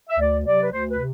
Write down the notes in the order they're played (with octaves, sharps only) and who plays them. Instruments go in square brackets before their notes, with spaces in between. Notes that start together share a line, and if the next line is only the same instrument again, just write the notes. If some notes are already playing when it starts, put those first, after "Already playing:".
[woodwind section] E5
D2 D5
C3 F#3 D5
B4
D2 C5
B4
C3